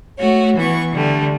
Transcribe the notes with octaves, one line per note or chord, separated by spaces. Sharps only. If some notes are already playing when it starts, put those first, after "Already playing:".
A3 F#4 C#5
E3 B3 C#6
D3 G3 A3